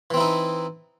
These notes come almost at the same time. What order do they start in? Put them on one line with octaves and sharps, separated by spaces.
E3 C4 E4 D#4